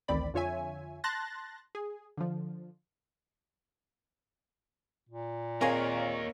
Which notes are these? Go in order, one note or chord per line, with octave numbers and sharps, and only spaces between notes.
A1 D2 D#3 C4 D5 B5
F2 D3 F4 C#5 E5 G#5
A5 C6 F#6 A6 A#6
G#4
D3 F3
A#2
A#3 C4 G#4 A#4 C#5 D#5 F5 G#5